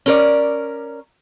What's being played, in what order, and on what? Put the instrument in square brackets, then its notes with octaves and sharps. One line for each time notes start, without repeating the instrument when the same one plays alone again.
[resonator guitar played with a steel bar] C#4 A#4 D5